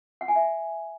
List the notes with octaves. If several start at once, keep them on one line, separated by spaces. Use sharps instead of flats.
F#5
G#5
E5